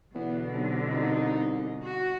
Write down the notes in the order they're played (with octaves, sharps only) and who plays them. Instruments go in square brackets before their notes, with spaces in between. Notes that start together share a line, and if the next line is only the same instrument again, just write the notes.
[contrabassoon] E2 [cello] B2 D3 [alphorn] B3
[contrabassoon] B1 [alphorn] C3
[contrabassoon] C2 [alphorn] D#4
[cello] F#4